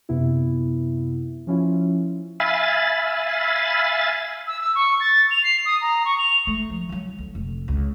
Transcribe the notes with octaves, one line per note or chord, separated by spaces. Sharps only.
F#2 C3 B3 E4
F3 C#4 E4 F4
E5 F5 G#5 B5 A6
E6
E6
C#6
A6
F7
C7
D#6
A#5
C#6
F7
A3
F3
E3 F#3
D2
F1
C#2